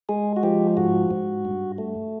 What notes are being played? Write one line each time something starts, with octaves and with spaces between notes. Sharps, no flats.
G#3 G#4
F#4
F3 G4
G#2 F#4
G#2
G2
A3